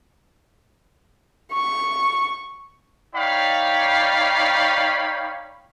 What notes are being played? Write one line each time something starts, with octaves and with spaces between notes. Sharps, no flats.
C#6
D#4 C#5 D5 F5 G5 B5